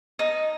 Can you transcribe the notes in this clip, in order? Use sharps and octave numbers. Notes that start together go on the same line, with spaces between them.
D#4